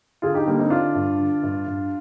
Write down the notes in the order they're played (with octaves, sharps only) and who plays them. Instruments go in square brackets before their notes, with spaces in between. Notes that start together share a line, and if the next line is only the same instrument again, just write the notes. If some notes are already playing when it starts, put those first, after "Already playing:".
[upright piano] D3 F4 G#4
D#4 G4
D3 G3 A#3
C4 D#4
D3 D4 F4
G2
D3
G2
G2